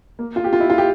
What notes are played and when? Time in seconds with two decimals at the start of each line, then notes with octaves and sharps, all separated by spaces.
0.19 A#3
0.36 F4
0.44 G4
0.53 F4
0.60 E4
0.70 F4
0.78 G4